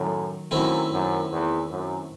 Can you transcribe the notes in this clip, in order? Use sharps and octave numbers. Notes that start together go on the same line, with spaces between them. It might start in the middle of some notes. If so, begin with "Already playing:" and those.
Already playing: F#2 A2 D#3 F#3
F#2 D#3 A3 C4 E4
F#2
E2
F#2